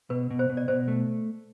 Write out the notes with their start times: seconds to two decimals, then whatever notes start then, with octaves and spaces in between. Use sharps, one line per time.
0.10 B2 B4
0.31 B2
0.39 C5
0.49 B2
0.57 D5
0.68 B2 C5
0.88 A3